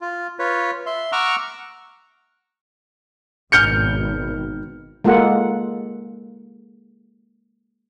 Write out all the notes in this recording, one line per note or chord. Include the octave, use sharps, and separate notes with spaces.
F4
F4 B4 C#5
E5 C6
F#5 A#5 C#6 D6 E6 F6
G#1 B2 D#3 F6 G6 C#7
G#3 A#3 F4 A4 F#5